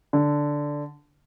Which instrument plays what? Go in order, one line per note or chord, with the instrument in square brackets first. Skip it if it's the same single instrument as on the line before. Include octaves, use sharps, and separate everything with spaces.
[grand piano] D3